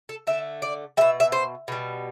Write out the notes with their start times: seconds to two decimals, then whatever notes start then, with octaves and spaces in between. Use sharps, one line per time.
0.09 A4
0.27 D3 A3 E5
0.62 D5
0.97 B2 G3 E5
1.20 E5
1.32 C5
1.68 B2 G3